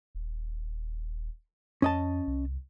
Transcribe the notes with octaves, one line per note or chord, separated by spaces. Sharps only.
D#1
F2 C#4 D#5 A5
C2